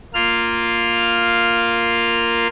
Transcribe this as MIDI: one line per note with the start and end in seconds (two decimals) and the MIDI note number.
0.14 2.47 58
0.14 2.47 65
0.14 2.47 89